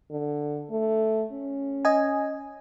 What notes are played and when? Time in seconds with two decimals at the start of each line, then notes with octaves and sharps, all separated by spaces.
0.11 D3
0.70 A3
1.33 C#4
1.85 D#5 G#5